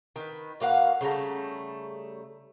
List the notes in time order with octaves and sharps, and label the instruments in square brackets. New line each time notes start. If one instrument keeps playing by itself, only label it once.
[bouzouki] D#3 B4
B2 A#3 F5 F#5
C#3 G3 A3 A#5